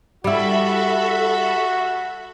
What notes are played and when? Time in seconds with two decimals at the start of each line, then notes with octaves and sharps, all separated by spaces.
0.24 G3 E4 F#4 A4 E5 B5